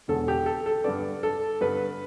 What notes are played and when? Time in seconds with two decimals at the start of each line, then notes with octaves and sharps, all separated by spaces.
0.08 E1 E2 D3 A4
0.28 G4
0.46 A4
0.66 A4
0.84 G2 D3 B3 D5
1.23 A4
1.61 G2 D3 B3 B4